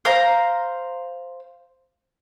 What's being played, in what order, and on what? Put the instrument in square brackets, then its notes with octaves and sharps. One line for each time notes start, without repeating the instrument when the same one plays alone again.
[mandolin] C5 F5 A#5